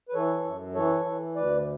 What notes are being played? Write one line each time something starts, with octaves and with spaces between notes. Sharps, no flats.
B4
E3 A4 C#5
F#2
E3 A4 C#5
E3
D2 B4 D5